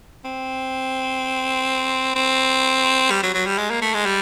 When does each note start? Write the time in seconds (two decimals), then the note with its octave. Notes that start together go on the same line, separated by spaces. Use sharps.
0.25 C4
2.15 C4
3.11 G3
3.23 F#3
3.34 F#3
3.46 G3
3.58 G#3
3.70 A#3
3.82 A3
3.94 G#3
4.06 G3